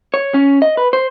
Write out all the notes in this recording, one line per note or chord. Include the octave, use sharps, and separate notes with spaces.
C#5
C#4
D#5
B4
C5